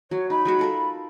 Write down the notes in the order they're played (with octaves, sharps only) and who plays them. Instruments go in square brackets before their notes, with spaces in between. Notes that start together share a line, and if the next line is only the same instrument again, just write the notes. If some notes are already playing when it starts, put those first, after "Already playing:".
[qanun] F#3 [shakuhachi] C#5
[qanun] D#4 [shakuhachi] B5
[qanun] F#3 G#3 F#4
F4 A4 A#4